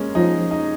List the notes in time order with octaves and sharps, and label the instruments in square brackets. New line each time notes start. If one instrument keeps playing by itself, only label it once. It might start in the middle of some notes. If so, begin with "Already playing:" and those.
Already playing: [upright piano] G#3 A#3 C#4
[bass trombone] F3 [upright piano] D#4
[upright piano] D#4